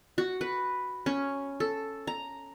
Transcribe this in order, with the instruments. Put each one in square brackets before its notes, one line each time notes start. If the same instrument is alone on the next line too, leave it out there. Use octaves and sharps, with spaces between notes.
[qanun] F#4
B4
C#4
A4
A#5